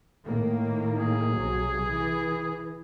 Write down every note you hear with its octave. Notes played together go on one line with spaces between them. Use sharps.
A2 D#3 A#3
G#4
B1 C3 F#3
E3